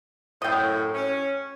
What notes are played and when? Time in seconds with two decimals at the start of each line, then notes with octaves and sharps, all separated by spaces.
0.42 F#2 A2 D#5 G5
0.95 C#4